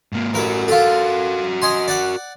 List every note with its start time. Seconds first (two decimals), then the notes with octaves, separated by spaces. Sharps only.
0.13 G#2 A#3
0.34 A1 F#4 A#4 B4
0.68 F4 A4
1.62 D#5 G#5 C6
1.88 D5 F#5